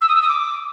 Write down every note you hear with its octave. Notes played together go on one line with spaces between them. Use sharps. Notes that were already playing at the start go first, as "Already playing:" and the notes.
E6
D#6
E6
D#6
D6